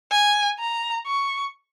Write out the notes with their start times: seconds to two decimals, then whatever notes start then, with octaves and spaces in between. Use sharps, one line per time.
0.12 G#5
0.59 A#5
1.07 C#6